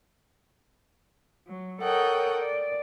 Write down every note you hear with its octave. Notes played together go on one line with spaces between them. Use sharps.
F#3
A4 A#4 C#5 D#5 F#5 G5
D5